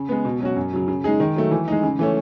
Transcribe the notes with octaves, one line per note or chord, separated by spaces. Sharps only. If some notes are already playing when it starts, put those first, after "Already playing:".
Already playing: C#3
G#3 B3
B2
F#3 C#4 F#4
F#2
C#3 F#3
C#3
G#3 D#4 G#4
D#3
F#3 A3
E3
G#3 D#4
C#3
E3 A3 C#4